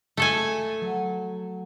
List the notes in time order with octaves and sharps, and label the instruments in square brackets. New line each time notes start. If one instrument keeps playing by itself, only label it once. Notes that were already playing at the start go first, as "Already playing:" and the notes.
[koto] A3 A4 G#5
[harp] F#3